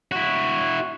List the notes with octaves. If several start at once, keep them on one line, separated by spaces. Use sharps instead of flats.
E4 F#4